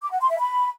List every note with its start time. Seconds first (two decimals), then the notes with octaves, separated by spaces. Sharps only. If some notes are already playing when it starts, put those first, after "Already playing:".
0.02 D6
0.11 F#5
0.21 C6
0.30 E5
0.39 B5